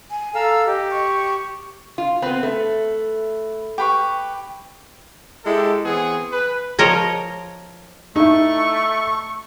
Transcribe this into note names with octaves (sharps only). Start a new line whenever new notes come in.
G#5
A4 F5 A#5 E6
G4 D#5
C#6
F4
B3 C4 B4
A3
G4 B4 C#6
G#3 E4 G4 A4
E3 B3 C4 G#4
B4
F3 A#4 C#5 D#5
A3 D#4 E4 C#6